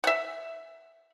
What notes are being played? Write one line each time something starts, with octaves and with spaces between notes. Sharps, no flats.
E5 F#5